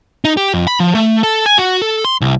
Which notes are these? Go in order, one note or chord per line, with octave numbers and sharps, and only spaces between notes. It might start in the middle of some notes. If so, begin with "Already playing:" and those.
D#4
G4
F2
B5
F3
A3
A4
G#5
F#4
A4
C6
C2